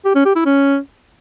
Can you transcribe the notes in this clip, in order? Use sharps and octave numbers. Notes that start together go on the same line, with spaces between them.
G4
C#4
G4
E4
C#4